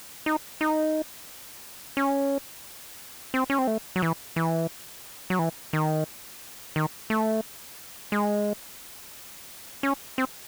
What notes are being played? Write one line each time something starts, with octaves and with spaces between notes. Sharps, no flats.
D#4
D#4
C#4
C4
C#4
C4
A3
F#3
E3
E3
F#3
E3
D#3
D#3
A3
G#3
C#4
C4